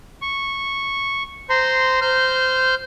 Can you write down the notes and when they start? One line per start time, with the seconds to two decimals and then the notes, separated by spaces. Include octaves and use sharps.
0.22 C#6
1.50 C5 A#5 C6
2.01 C5 F6 G6